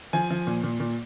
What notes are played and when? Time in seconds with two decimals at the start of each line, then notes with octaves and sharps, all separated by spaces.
0.13 F3 G#5
0.31 F3
0.47 A#2
0.63 A#2
0.80 A#2